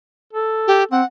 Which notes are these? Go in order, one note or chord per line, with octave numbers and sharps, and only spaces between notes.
A4
G4
C4 F#5